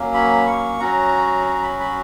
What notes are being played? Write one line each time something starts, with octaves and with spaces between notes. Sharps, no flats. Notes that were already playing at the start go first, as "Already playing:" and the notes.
Already playing: F#3 A#3 C#4
B5
C#6
F#3 C#4 F#4 A#5
A#5
B5
B5